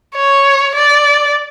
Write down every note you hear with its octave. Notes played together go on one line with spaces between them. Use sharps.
C#5
D5